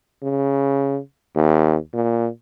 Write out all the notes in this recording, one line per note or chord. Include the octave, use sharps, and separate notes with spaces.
C#3
D#2
A#2